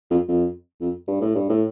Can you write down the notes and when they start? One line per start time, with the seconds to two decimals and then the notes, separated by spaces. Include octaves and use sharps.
0.11 F2
0.28 F2
0.81 F2
1.08 G2
1.21 A2
1.35 G2
1.49 A2